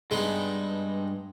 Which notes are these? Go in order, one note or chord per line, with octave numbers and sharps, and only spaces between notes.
G2 G#3 B3 D#4